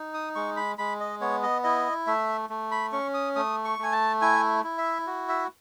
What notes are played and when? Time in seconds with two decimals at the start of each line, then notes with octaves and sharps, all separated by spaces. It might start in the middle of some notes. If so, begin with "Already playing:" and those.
Already playing: D#4
0.14 D#6
0.35 G#3 C#6
0.57 B5
0.78 G#3 B5
1.00 D#5
1.21 B3 C#5
1.43 D#5
1.64 E4 D#5
2.07 A3 E5
2.50 A3
2.71 B5
2.92 C#4 C#6
3.14 D#6
3.36 A3 D#6
3.64 C#6
3.79 A3 G#5
3.92 A5
4.22 E4 G#5
4.64 E4
4.78 E5
5.07 F#4
5.29 E5